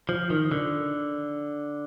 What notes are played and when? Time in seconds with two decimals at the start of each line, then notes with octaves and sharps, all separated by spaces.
0.09 F3
0.30 D#3
0.52 D3